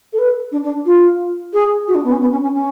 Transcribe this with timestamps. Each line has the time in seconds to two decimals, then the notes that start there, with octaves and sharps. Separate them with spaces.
0.12 A4
0.18 B4
0.52 D4
0.63 D4
0.85 F4
1.53 G#4
1.87 F#4
1.95 D4
2.04 B3
2.12 C#4
2.20 B3
2.31 C#4
2.42 C#4
2.54 C#4